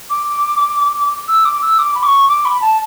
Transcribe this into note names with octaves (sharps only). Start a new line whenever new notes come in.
D6
E6
D6
E6
D6
B5
D6
C#6
D6
B5
A5